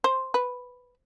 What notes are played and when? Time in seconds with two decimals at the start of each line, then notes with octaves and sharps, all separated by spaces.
0.04 C5
0.34 B4